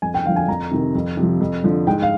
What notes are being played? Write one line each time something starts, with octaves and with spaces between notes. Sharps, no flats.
F2 G#5
G5
D3 F3 F5
G#5
F2 A#5
C3 D#3
F2
C3
F3
F2
D3 F3
G#2 G5
F5